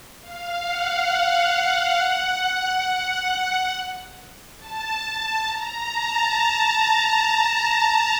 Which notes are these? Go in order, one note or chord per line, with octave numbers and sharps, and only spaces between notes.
F5
F#5
F#5
A5
A5
A#5
A5